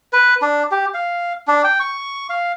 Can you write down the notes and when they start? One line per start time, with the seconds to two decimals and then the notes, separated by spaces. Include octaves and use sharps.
0.13 B4
0.42 D4
0.71 G4
0.94 F5
1.47 D4
1.64 G5
1.80 C#6
2.29 F5